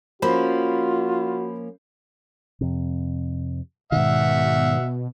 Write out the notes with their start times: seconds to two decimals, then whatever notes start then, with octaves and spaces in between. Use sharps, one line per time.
0.22 F3 A#3 C#4 F4 F#4 C5 B5
2.61 F2 C3
3.92 G#2 B2 D#3 E5 F#5